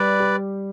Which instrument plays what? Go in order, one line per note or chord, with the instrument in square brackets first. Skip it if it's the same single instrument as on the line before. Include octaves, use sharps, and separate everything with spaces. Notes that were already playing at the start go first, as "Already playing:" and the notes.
Already playing: [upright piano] G3 [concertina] B4 D5
[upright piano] G4